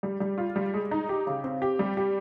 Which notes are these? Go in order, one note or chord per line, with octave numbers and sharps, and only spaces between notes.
G3
G3
F4
G3
G#3
D#4
G4
C#3
C4
G4
G3
G4